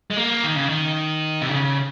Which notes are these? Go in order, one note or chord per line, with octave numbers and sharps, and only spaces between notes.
G#3
A#3
D#3
C#3
D#3
C3
C#3